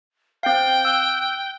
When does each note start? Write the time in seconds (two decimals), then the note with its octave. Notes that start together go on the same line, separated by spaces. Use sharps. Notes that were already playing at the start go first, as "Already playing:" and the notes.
0.43 C4 F5 G5
0.85 E6 F#6